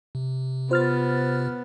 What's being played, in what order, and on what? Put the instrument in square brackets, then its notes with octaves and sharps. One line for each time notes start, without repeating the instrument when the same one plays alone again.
[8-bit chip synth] C3
[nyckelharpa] B3 [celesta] F4 [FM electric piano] C5 F6 A6